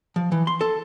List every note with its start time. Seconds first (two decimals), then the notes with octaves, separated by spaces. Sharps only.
0.16 F3
0.32 E3
0.47 C6
0.61 A4